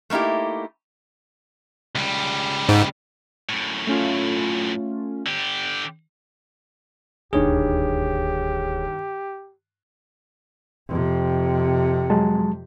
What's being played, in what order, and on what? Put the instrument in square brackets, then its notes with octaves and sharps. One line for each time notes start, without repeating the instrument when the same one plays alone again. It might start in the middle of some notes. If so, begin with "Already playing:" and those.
[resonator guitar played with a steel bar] A3 A#3 D#4 E4 G4
[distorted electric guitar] C#2 G3
[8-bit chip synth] G#2
[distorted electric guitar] F#2 A2
[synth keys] A3 C#4 F4
[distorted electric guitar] D3 G4
[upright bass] D#1 D2 [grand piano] G2 D#3 [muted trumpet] G4 [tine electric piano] G#4 C#5
[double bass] F2 C3
[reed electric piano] F#3 G#3 A5